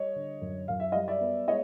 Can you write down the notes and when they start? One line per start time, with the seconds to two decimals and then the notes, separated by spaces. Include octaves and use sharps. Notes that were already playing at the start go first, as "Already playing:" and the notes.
Already playing: G3 C#5 D#5
0.16 D3
0.42 F#2
0.68 F#2 F5
0.80 E5
0.92 G3 D#5 F5
1.08 D5 E5
1.21 B3
1.48 G#3 C#5 D#5